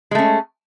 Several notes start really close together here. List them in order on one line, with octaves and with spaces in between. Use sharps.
G#3 A3 C#4